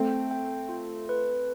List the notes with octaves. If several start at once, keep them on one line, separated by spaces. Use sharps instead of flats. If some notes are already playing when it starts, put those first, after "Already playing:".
Already playing: A3 C4 G5
G5
F4
B4